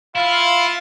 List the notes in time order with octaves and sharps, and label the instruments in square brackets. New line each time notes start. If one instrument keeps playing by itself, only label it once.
[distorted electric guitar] E4 [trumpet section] F4 [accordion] F5